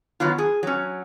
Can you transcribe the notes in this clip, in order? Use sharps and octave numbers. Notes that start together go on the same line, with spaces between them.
D#3 F#3 B3 F4
G#4
F#3 C#4